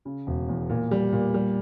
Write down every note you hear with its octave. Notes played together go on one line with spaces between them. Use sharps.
C#3
E1
E2
A#2
G3
A#2
G3